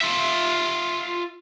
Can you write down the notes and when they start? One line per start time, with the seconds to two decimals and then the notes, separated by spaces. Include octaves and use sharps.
0.01 F4 E5